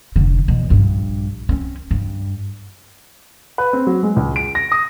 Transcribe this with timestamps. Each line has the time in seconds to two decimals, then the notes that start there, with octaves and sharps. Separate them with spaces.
0.16 F1 D3
0.48 E2 B2
0.70 A#1 G2
1.49 C4 C#4
1.91 G2
3.58 B4
3.73 C4
3.87 F#3
4.03 G#3
4.16 C#2
4.36 D7
4.55 A#6
4.72 D#6